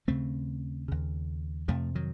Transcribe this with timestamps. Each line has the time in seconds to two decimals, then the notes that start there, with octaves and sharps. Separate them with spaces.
0.08 D#2 C#3 A3 C4
0.88 D#2 C#3
1.68 F2 C3 F3 A3
1.95 D#3 F#3